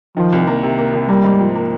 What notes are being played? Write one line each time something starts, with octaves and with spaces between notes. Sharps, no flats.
D#3 F3
C2
A#3
C3
A#3
C2
G3 A#3
G#2
F3
A#3